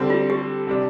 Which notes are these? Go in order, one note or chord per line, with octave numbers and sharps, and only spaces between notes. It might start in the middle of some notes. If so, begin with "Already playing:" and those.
Already playing: D3 G3 C4
F4
G4
C3 G3 D4